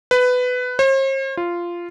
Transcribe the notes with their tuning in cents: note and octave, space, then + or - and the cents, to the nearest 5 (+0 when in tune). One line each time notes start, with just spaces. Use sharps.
B4 +15
C5 +45
F4 -10